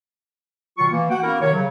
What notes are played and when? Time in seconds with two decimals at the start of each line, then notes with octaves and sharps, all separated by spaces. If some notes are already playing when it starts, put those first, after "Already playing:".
0.78 B2 D#3 F#3 F4 C#6
0.91 E3 A#3
1.10 F#4 F#5 G5
1.23 A#3 B3 C#4 E4 F#4 A#4
1.42 C3 D#3 C#5
1.53 C#3 F#3